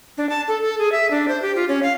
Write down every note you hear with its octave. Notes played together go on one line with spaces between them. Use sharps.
D4
A5
A4
A4
G#4
E5
D4
C5
G4
F4
C#4
F5